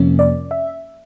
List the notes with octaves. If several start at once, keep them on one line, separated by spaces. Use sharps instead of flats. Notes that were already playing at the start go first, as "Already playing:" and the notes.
Already playing: F2 C3 F3 A#3 C#4
D5
E5